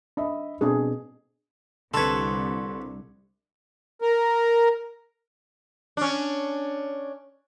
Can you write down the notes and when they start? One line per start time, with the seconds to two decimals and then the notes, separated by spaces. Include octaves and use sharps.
0.17 D4 D#5 E5 B5
0.61 B2 C4 D4 G#4
1.94 C2 D3 A4 B4 C6 C#6 G#6
4.02 A#4
5.97 C#4 D4